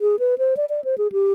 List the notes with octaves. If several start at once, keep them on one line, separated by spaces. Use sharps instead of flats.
G#4
B4
C5
D5
D5
C5
G#4
G4